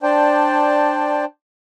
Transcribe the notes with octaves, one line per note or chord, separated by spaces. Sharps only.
D4 C5 D5 G5 A5